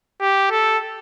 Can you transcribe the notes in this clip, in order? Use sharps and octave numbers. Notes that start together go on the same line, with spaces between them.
G4
A4